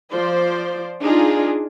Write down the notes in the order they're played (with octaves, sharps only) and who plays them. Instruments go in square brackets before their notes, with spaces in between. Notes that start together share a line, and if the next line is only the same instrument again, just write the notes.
[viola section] F3 C5 D5
D4 D#4 F4 G#4